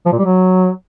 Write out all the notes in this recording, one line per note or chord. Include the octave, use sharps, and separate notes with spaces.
F3
A#2
G3
F#3